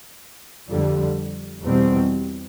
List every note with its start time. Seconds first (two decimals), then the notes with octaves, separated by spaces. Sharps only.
0.67 F2 D3 G3
1.63 E2 B2 G3 C4